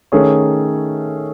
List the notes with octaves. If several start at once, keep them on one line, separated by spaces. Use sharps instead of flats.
D#3 A3 C#4 G#4 C#5